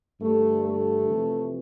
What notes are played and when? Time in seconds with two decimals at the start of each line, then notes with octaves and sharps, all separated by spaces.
0.20 G2 D3 A3
0.63 A3
1.06 F2 C3 E3